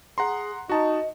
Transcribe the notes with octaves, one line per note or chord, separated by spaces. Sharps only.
G#4 F#5 A#5 C6
D#4 F#4 D#5 A5